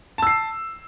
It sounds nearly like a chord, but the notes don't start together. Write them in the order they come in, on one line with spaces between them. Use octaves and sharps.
A5 E6 C7